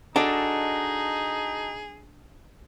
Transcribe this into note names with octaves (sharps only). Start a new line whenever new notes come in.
D4 D#4 F#4 G#4 A4 D#5